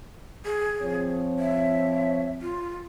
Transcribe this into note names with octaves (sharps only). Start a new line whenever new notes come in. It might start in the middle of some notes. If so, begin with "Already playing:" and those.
G#4
F3 C4 C#5
E5
F4